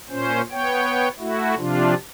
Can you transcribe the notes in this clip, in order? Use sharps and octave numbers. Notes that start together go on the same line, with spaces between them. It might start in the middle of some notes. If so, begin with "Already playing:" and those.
A#2 C#4 C5
B3 C#5 G5
A3 E4 F#4
C3 F3 D4 F4